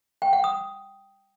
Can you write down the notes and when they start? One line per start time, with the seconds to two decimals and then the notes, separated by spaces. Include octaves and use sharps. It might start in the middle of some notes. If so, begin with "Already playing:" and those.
0.22 G5
0.33 F#5
0.44 D#6